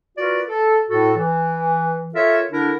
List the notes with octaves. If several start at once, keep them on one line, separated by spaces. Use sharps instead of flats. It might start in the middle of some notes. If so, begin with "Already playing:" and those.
F4 F#4 A#4 B4 D5
A4
A2 F#4 A4
E3
F4 A4 A#4 C#5 E5
D3 D4 E4 A#4